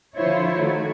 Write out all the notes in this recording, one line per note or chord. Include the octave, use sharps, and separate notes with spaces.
D3 F3 E4 F4 C5 C#5
D#3 A3 F#4